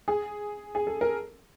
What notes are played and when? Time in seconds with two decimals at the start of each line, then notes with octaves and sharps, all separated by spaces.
0.08 G#4
0.75 G#4
0.87 A4
1.01 A#4